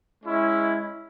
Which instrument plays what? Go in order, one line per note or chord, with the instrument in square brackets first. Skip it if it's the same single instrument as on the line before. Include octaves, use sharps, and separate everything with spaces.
[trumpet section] G#3 C#4 E4